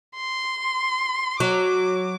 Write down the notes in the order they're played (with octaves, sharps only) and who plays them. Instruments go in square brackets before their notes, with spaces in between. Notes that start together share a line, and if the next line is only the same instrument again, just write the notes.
[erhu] C6
[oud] F#3 [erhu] D6